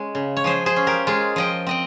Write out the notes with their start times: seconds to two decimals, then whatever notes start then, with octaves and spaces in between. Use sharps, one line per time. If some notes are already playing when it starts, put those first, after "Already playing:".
Already playing: G#3 C#4
0.15 C#3
0.37 C#5
0.44 F3 G#4 C5
0.66 G#4 C5
0.76 C#4
0.87 G4 A#4
1.07 G#3 F4 G#4
1.36 F3 D#5 G5
1.67 C4 D#5 G5